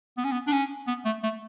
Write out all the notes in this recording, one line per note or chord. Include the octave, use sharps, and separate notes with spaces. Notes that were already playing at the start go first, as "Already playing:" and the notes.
B3
C#4
B3
D4
C#4
B3
A3
A3